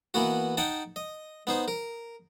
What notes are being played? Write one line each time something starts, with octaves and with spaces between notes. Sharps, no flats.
E3 A#3 B3 F#4
D#4 F#5 G5 A5 D#6
D#5
B3 D#4 C5
A#4